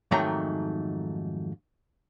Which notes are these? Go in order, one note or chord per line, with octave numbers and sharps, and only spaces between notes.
F2 G#2 D#3 F#3 A3 A#5